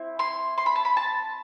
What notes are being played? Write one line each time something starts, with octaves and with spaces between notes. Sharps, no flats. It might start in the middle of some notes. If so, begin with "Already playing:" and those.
Already playing: C4 E4
C6
C6
B5
A5
B5
A5